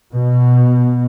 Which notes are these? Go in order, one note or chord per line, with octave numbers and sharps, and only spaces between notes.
B2